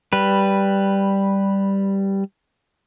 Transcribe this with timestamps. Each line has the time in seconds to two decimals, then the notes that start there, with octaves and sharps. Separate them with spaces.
0.13 G3 B4